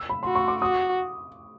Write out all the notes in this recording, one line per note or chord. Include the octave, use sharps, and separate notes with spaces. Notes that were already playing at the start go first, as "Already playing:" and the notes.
Already playing: E6
B5
F#4 C6
C#6
D6
F#4 D#6